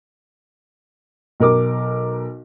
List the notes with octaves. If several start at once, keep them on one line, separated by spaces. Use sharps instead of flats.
B1 A#4 D6